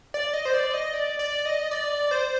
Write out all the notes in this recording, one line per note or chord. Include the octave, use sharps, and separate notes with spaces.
D5
D#5
C5
D5
D#5
D5
D5
D#5
D5
C5